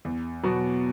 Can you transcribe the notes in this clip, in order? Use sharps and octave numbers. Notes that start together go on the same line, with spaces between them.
E2
B2 F#3 B3 F#4